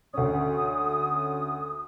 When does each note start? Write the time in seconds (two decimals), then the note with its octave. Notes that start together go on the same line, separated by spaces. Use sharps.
0.14 D2 C#4 D#6